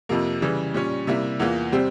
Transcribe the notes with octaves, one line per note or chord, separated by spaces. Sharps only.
F2 C3 F3 A#3
C#3 E3 G3
A#2 G3 C#4
C3 G3 A#3 E4
E2 E3 A#3 F4
C3 G3 C4